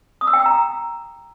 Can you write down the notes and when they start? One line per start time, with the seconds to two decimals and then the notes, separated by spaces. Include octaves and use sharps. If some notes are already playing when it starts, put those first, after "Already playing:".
0.21 D#6
0.27 E6
0.33 G5
0.40 E6
0.46 A#5